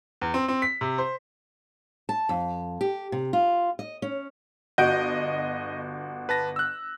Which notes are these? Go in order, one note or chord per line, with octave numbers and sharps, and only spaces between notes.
E2
C4
C4
B6
C3
C5
A5
F2
G4
C3
F4
D#5
C#4
G1 F#4 D#5 G6 D7
B4 A5 A#6
E6 F#6